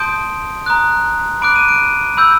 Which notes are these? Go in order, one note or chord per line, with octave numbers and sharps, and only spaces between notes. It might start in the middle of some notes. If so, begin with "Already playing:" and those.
Already playing: A5 C6 D#6 G6 D7
A#5 D#6 F#6
B5 D6 F#6 D7
D#7
D7
B5 E6 G6